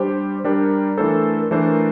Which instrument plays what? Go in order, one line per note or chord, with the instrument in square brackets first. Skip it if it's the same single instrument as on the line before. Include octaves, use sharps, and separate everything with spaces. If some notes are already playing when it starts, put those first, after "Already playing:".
Already playing: [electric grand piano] G3 D4 G4 [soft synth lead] C5
[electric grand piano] G3 D4 G4 [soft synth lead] A#4
[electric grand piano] E3 A3 D4 A4 C5
[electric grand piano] E3 A3 D4 A4 C5 [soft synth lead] A#4